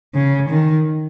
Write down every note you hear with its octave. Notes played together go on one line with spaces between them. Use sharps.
C#3
D#3